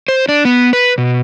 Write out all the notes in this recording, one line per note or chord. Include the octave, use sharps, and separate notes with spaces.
C5
D4
B3
B4
B2